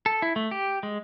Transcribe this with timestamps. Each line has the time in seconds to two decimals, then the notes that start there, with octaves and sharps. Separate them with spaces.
0.06 A4
0.22 E4
0.36 A3
0.51 G4
0.83 G#3